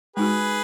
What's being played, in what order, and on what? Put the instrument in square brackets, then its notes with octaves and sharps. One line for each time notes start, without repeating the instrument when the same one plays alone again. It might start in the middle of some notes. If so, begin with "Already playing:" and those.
[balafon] G#3 D#4 F#4 [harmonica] G#4 B4